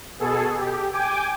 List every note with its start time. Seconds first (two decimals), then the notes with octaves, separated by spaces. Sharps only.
0.20 B2 G#4 A4
0.57 G4
0.92 G5 G#5 D6